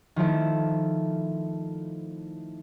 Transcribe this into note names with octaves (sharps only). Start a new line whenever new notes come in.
D#3 F3 A3 E4